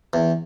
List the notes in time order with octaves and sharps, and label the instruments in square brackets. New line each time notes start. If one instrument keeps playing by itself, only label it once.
[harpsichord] E2